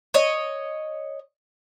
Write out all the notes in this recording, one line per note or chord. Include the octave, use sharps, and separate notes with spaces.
C#5 D#5